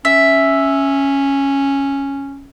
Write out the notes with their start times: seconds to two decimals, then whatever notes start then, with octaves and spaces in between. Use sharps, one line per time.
0.05 C#4 E5